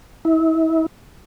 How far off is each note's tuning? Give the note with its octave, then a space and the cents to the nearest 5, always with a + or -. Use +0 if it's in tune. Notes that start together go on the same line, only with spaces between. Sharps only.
E4 -35